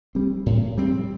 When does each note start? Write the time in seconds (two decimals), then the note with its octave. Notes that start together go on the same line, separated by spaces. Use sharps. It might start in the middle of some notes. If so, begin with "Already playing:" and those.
0.15 G3 C4
0.46 A2
0.78 G3 C4